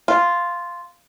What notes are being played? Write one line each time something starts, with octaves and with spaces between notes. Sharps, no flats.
F4